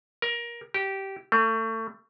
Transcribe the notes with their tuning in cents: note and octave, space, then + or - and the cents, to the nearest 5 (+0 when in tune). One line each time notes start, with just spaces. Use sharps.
A#4 +20
G4 -15
A3 +30